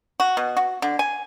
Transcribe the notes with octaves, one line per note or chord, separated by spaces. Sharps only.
F#4
B2
F#4
D3
G#5